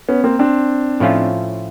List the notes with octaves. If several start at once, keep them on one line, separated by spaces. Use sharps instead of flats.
B3 C#4
A#3 C4
C4 D4
A2 F3 A3 C#4 F4